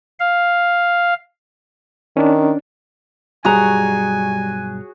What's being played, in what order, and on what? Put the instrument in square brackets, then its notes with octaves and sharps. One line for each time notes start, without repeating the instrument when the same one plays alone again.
[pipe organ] F5
[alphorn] D#3 [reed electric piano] C#4 D4
[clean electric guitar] B1 G2 A#5 [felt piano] G3 [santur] F#4 G#4 C#5 [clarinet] G#5